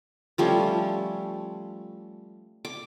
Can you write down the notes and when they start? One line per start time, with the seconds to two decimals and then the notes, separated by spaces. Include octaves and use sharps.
0.38 F3 G3 A3 C#4
2.65 D6